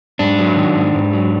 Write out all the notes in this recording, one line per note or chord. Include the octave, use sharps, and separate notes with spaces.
G#2 D4
F#3
D#3
G#2
G#2
F#3